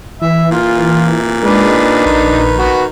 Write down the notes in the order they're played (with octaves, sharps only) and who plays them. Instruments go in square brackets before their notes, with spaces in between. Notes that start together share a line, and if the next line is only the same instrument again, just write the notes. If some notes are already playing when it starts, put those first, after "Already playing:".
[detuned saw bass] E3 [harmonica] E5
[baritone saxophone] A#2 [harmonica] F4
[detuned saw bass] G#3 [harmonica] D4 D#4 B4
[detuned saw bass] A#1 [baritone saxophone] D#3
[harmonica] F#4 B4